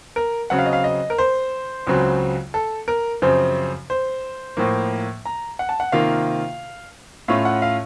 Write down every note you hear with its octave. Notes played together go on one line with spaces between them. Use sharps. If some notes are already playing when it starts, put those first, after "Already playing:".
A#4
C#3 F#3 C4 F#5
F5
D#5
F5
D#5
A#4
C5
C#2 C#3 F#3 C4
A4
A#4
F#2 C#3 F3 C4 C5
C5
A2 F3 A#3
A#5
F#5
A5
F#5
C3 D#3 A#3 F4 F5
A2 A3 C#4 F4 F5
F#5
F5